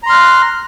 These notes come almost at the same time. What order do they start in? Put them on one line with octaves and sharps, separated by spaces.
A#5 C6 F6 F#6